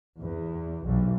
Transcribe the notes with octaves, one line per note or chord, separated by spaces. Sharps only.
E2
B1